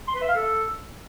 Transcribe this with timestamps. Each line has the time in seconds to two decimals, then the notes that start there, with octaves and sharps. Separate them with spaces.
0.08 C6
0.15 B4
0.22 E5
0.28 F5
0.35 A4